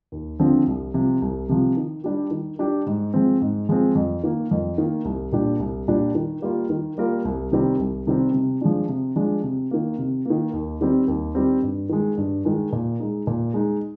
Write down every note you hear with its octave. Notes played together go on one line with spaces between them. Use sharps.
D#2
D3 F3 C4
C2
C3 F3
C2
C3 F3
D#3
G3 D4 G4
D#3
G3 D4 G4
G#2
F3 G#3 C4
G#2
F3 G#3 C4
F2
D#3 A#3
F2
D#3 A#3
C2
A#2 G3 D4 G4
C2
A#2 G3 D4 G4
D#3
G3 A#3 F4 A#4
D#3
G3 A#3 F4 A#4
C2
C3 D#3 G3 C4
C2
C3 D#3 G3 C4
C3
F3 G#3 D4
C3
F3 G#3 D4
C3
D#3 A#3
C3
D#3 A#3
D#2
D#3 G3 C4
D#2
D#3 G3 C4
G2
D#3 G#3
G2
D#3 G#3
A#2
G#3 D#4
A#2
G#3 D#4